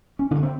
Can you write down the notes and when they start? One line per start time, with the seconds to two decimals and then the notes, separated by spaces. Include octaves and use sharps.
0.19 C#4
0.31 D3 D4
0.35 G2
0.43 C4